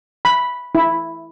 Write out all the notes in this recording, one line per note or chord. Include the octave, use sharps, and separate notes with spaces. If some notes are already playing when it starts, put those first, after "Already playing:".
B5
E4